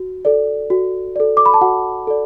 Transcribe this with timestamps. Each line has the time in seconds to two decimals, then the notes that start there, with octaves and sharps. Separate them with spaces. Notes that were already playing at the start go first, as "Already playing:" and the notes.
Already playing: F#4
0.25 A4 D5
0.70 F#4
1.16 A4 D5
1.37 D6
1.46 B5
1.54 A5
1.61 F#4 F#5
2.07 A4 D5